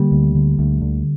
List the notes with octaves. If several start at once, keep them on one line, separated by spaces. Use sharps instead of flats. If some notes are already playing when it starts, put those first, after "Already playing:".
Already playing: D3 G3 A#3
D2
D3
D2
D3